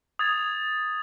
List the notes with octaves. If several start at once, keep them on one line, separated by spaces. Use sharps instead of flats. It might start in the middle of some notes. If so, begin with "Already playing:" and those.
D#6 G#6 A6 F7